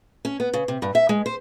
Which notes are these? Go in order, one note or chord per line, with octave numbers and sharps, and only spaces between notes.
C#4
B3
C#3
C3
G2
E5
G#3
C5